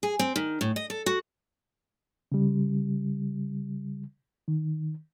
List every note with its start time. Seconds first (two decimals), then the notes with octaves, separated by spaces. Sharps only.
0.03 G#4
0.19 C4
0.36 D#3
0.61 A2
0.76 D#5
0.90 A4
1.06 F#4
2.32 C#3 G3
4.48 D#3